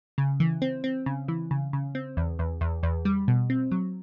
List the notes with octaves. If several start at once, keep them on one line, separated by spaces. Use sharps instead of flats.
C#3
E3
C4
C4
C#3
E3
C#3
C#3
C4
E2
E2
E2
E2
G3
B2
C4
F#3